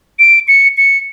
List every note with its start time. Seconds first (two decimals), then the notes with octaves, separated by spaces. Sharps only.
0.19 D7
0.48 C#7
0.77 C#7